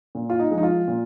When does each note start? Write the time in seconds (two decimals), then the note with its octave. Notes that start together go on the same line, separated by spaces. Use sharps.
0.15 A#2
0.30 F4
0.39 D#4
0.51 F3 G#3
0.58 D#4
0.63 F4
0.88 A#2